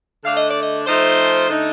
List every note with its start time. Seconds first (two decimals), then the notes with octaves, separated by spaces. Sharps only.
0.24 D3 A3 D4 F5
0.37 D#5
0.50 D5
0.62 D#5
0.87 F3 A3 D#4 C5
1.50 D3 A3 D#4